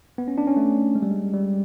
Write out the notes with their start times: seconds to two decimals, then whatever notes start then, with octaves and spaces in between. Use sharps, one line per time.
0.18 B3
0.28 C#4
0.38 D4
0.47 C#4
0.57 A3
0.95 G#3
1.02 G3
1.11 G#3
1.34 G3